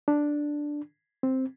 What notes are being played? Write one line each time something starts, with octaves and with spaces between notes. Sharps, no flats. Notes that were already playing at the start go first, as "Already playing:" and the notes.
D4
C4